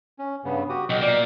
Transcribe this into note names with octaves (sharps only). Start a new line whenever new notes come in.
C#4
G2 C#3 B3
F#4 G4 D#6
B1 D#5 G5
A#2 A#3 D5